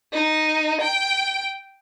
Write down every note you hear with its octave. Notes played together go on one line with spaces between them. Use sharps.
D#4
G5